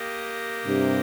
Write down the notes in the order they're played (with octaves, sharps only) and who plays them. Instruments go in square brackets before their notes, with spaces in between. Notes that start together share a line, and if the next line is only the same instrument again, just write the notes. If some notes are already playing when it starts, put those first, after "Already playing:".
Already playing: [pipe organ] A#3 G4 D#5
[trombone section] G2 C3